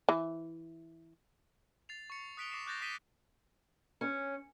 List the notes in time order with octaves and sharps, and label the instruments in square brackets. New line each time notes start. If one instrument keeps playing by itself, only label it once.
[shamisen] E3
[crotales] A6 C7 F7
C#6 C#7
D#6 F#6 B6 D7 F7 G7
D6 A#6 C7 E7
D6 F#6 G6 A6 A#6
C#6 D#6 B6 D#7 E7 G7
[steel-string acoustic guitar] C#4